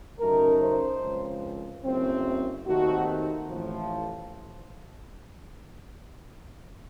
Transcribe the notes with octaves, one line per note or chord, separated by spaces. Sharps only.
F#2 C#3 A3 D#4 A#4
C5
C#2 C#3 F3 C4
F#1 F#2 C#3 A3 C4
D#2 D#3 A3 C4 D#4 F#4
A1 A2 F3